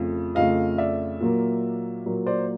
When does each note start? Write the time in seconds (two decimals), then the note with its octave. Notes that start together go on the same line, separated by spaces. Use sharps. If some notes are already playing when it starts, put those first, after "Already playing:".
Already playing: F2 C#3 F3 A3
0.35 F2 C#3 F3 A3 D#5 F5
0.78 D5 E5
1.20 A#2 F#3 A#3
2.06 A#2 F#3 A#3
2.26 C5 D5